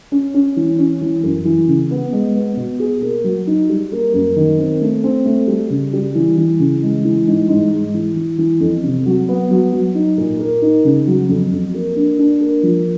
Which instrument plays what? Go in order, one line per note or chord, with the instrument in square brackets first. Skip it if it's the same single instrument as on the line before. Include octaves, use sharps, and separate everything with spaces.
[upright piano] C#4
C#4
E3
C#4
E3
F#2
E3
C#3
B3
G#3
B3
B2
G#4
A#3
F#3
D#4
G3
A#3
F#2
D#3
C4
A3
C4
A3
G3
C#3
G3
E3
E3
C#3
G#3
E3
G#2
G#2
G#3
E3
E3
E3
F2
C3
F#3
B3
F#3
F#3
D#4
A#2
A#3
D#4
C#3
F#3
F2
F2
A#3
D4
D4
A#3
F3